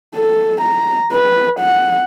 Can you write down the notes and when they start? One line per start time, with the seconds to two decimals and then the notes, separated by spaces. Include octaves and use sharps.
0.16 A4
0.61 A#5
1.13 B4
1.59 F#5